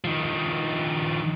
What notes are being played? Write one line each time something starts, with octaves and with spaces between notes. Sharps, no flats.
D#3 F3